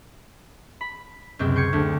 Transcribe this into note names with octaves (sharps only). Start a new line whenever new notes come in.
B5
C#2 F#2 C3 C4
G5 C6 C#6 G6 G#6 C#7
D2